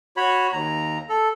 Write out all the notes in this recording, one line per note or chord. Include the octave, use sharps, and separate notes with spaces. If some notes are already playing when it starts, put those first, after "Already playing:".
F#4 C#5 B5
D#2 A#5
A4